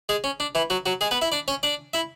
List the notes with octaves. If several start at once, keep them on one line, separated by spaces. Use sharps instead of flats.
G#3 G#4
C#4
D4
E3 E4
F#3 F#4
F#3 F#4
G#3 G#4
B3 B4
E4 E5
D4 D5
C#4 C#5
D4 D5
E4 E5